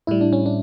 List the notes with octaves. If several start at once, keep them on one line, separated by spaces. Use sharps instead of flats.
A2 G3 E4
D4
C#4
D4